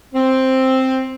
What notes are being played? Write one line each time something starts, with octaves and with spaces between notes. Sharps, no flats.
C4